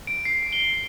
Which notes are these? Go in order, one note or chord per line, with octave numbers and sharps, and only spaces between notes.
D7
C7
G7